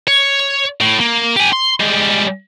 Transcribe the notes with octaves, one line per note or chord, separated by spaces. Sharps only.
C#5
A2
A#3
G4 G#5
C6
G3 G#3